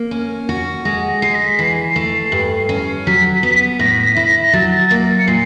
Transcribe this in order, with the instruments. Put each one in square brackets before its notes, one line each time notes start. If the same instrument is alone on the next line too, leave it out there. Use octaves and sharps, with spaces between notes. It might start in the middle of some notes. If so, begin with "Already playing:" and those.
Already playing: [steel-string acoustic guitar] A#3
C#4
F#4
[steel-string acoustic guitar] G#3 [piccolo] A#6
[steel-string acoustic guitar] G#3 [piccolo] C7
[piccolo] A#6
B6
[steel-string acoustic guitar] E3 [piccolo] C7
[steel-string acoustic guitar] A3
G2
C#4
[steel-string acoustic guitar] F#3 [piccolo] B6
[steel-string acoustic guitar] B3
[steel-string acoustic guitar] A2 [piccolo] A#6
[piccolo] B6
A#6
[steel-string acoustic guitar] E4 [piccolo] B6
[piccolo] A#6
A#6
[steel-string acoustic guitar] F#3 [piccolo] A6
[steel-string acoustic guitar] A#3
[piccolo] C#7
[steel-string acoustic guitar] A#2 [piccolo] C7